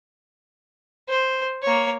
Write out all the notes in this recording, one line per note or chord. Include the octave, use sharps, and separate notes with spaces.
C5
A#3 C#5